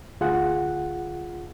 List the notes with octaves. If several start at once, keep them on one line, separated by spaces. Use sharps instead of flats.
D2 F4 G#4 F#5